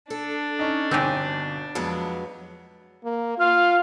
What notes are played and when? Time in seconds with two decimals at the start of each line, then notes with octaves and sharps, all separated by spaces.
0.10 D4 A4
0.59 C#4 D#4
0.91 G1 B2 C4 D#4 G4 G#5
1.75 F2 F#3 G#3 B3
3.04 A#3
3.38 F4 F5